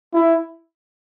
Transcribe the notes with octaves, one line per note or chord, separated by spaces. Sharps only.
E4